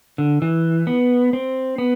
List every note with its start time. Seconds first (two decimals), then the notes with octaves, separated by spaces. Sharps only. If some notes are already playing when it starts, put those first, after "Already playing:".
0.18 D3
0.42 E3
0.87 B3
1.33 C4
1.78 B3